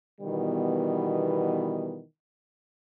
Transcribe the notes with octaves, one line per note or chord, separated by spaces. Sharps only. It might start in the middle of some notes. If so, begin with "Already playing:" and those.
B2 D#3 E3 G3 B3